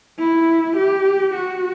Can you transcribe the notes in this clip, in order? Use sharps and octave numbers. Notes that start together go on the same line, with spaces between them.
E4
G4
F#4